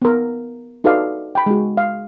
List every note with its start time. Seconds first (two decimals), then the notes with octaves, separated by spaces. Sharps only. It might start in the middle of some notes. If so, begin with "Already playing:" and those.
0.02 B3 A#4
0.84 D#4 F#4 A4 B4 D5 F5
1.35 G5 B5
1.46 G#3 F#4
1.77 F5